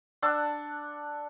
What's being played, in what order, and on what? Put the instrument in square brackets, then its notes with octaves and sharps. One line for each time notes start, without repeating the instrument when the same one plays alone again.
[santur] D4 F#5 A5 E6